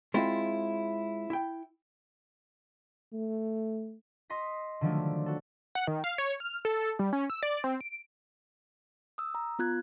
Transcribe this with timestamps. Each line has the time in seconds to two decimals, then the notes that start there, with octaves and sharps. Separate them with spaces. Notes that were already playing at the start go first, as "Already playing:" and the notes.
0.14 G#3 C4 E4 F4
1.30 E4 G5
3.13 A3
4.30 D#5 C6 A#6 B6
4.81 D3 D#3 F3 F#3 A3 D4
5.26 F#4 A4
5.75 F#5
5.87 D#3
6.04 F5
6.18 C#5
6.40 F6
6.65 A4
6.99 G3
7.13 C#4
7.30 E6
7.43 D5
7.64 C4
7.81 D7
9.18 D#6 E6
9.35 A#5
9.59 B3 F4 F#6 G#6